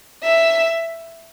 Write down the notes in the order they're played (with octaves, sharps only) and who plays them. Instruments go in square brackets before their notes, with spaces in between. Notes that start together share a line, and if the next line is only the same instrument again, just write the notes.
[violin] E5